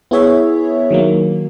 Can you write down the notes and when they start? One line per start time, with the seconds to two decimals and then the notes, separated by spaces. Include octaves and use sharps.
0.11 B3 E4 G#4 C#5 E5
0.91 D#3 F#3 A#3